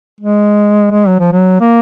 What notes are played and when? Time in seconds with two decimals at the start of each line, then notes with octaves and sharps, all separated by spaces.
0.21 G#3
0.91 G#3
1.08 F#3
1.20 F3
1.32 F#3
1.61 A#3